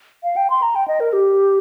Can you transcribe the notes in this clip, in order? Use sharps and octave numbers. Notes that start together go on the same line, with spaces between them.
F5
G5
C6
A#5
G5
D#5
A#4
G4